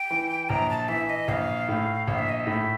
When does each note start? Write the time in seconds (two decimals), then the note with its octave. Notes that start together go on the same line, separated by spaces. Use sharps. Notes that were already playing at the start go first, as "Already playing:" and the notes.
Already playing: G5
0.11 E3
0.49 A#1 A#5
0.70 A5
0.88 E3 E5
1.09 D#5
1.28 A#1 F5
1.68 A2
2.07 A#1 F5
2.19 E5
2.29 D#5
2.40 E5
2.47 A2